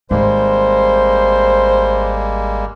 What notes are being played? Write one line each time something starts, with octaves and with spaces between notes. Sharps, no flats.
G#1 G3 G#3 A#3 C5